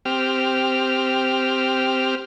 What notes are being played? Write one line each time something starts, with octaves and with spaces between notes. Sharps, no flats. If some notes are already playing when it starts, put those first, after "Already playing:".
C4 G4 F6